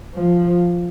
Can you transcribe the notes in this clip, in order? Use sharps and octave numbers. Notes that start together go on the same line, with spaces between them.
F3